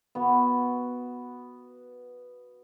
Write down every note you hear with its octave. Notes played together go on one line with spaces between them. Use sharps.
B3 F#4